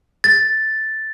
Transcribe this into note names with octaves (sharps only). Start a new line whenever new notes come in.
A6